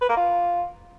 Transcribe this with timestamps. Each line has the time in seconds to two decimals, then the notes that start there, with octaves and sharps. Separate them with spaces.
0.01 B4
0.09 A#3
0.17 F4